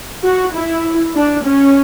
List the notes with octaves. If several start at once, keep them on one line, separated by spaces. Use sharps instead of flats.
F#4
E4
D4
C#4